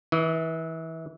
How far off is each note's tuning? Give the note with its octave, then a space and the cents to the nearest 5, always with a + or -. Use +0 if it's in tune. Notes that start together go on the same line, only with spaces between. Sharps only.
E3 -25 D#5 +30